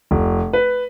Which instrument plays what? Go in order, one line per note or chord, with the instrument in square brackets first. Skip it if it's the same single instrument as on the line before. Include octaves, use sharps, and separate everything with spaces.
[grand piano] F1
B4